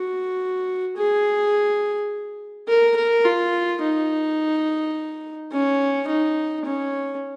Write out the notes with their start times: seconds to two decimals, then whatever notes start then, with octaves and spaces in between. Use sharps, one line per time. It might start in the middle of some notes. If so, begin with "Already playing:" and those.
Already playing: F#4
0.97 G#4
2.68 A#4
2.96 A#4
3.25 F4
3.81 D#4
5.52 C#4
6.07 D#4
6.65 C#4